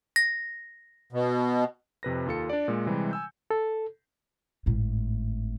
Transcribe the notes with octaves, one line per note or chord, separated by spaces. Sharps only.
A#6
B2
F2 C3 B4 A#6
D#2 F4 A4 C#7
D4 D5
A#2 G#3
C3 E3 G3 G#3
G#5 E6 G6
A4
G#1 A2